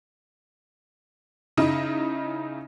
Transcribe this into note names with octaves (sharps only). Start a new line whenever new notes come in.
C#3 D#4 E4